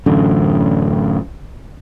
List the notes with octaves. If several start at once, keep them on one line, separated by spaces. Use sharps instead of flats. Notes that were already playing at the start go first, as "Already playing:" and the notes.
A1 F#2 D3